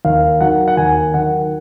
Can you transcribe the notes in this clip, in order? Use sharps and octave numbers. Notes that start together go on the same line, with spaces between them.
D#2 F5
D#3 F#3 F#5
F#5
D#2 G#5
D#3 F#3 F#5